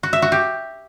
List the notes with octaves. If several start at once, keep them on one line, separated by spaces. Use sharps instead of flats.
F#4
E5
F#4
G4